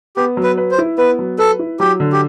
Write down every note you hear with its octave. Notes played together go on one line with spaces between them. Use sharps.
B3 G4
F#3
B4
B4
C5
E4
B3 B4
F#3
A4 B4
E4
F#3 G4
D3
G4